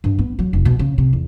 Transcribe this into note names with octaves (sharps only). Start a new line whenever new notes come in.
G2
B3
F#3
F1
B2
C#3
C3
E2